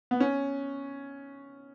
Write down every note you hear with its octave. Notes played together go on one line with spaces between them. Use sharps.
B3
C#4